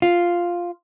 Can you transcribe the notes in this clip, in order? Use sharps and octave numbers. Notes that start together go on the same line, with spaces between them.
F4